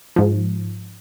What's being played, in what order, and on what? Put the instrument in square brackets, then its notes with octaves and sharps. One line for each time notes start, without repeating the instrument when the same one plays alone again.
[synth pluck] G#2 F3